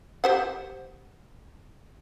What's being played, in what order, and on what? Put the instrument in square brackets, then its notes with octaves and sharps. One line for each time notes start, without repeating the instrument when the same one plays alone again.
[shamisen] G4 C5 F#5